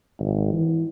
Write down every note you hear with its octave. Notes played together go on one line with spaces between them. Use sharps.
G#1
E3